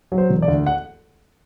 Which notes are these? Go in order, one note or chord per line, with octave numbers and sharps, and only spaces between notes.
F#3
C5
E1
D5
D2
F#5